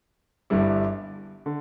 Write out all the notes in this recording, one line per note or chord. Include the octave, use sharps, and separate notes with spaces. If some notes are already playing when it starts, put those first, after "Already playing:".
G1 G2 G3 E4
D3